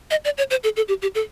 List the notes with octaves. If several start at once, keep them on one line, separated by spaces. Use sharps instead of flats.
D#5
D5
C#5
C5
A4
A4
G4
G4
A4